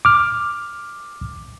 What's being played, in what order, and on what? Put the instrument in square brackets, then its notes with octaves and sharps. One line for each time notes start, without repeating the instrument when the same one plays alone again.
[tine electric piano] D6 F6